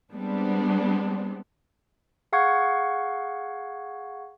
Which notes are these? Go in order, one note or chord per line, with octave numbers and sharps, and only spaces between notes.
G3 G#3 B3 C4 D4
G#4 F5 F#5 C#6 G#6